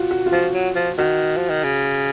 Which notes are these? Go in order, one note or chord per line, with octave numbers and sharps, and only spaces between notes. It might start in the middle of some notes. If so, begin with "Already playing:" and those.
Already playing: F4 F#4
F#4
F4
F3 F#4
F#3
F3
D#3 F#4
F3
D#3
C#3